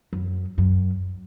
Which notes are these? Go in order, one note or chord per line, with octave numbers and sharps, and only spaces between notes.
F#2
F#2